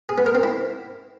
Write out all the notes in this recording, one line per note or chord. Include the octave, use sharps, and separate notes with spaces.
G#4
B3
A#4
C4
E4